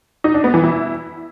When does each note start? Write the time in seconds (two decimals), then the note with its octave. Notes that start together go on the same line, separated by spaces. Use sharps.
0.24 D#4
0.34 D4
0.44 B3
0.54 E3
0.64 E4